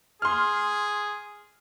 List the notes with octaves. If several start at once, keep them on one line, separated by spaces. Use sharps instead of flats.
G#4 C6 F6